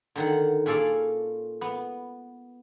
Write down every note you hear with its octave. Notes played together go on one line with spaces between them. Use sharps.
D3 D#3 F#5
A#2 C#4 G#4 A4 D5 F5
B3